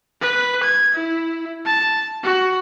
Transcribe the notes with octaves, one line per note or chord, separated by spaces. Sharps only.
B4
G#6
E4
A5
F#4